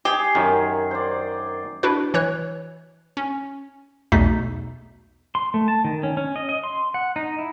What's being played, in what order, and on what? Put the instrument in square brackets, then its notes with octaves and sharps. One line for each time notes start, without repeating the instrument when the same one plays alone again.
[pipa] G4 [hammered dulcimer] G#4 G#5
[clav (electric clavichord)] F#2 D#3
[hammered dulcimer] C5 D5
[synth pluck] D4 E4 F#4 B4
E3 C#5 F#6
C#4
B1 E2 B2 A3 D#4 B6
[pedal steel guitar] C6
A3
A5
D#3
C#4
C#4
D#5
D#5
C6
F#5
D#4
E4